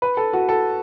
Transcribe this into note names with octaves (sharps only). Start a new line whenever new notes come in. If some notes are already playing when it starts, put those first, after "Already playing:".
B4
A4
F#4
A4